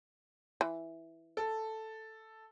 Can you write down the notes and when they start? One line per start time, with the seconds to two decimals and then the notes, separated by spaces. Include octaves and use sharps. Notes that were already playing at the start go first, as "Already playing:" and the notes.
0.61 E3
1.37 A4